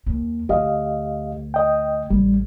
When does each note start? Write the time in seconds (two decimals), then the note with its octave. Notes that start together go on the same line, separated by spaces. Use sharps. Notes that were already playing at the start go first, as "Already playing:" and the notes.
0.06 D#2
0.49 D2 G4 D#5 F5
1.54 D#5 G5
2.10 A1 G3